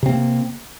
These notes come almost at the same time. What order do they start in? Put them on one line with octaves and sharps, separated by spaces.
C3 C4 A#3